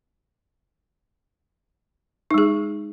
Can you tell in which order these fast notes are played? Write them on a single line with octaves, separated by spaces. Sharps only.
D#4 G#3 G#4